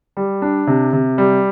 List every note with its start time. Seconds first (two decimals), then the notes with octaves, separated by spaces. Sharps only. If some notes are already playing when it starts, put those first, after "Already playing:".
0.17 G3
0.42 D4
0.67 C3
0.93 C3
1.18 G3